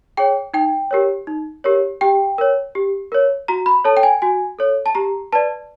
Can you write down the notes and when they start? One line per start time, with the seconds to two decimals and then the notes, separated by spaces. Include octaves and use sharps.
0.17 G#4 C#5 G5
0.54 D#4 G5
0.91 G4 A#4 C#5
1.27 D#4
1.64 G4 A#4 C#5
2.01 G4 G5
2.38 A#4 C#5
2.75 G4
3.12 A#4 C#5
3.48 F#4 A#5
3.66 B5
3.85 A4 C#5 A5
3.97 G5
4.03 G#5
4.22 F#4 G#5
4.59 A4 C#5
4.86 A5
4.95 G4 A#5
5.33 B4 D5 A5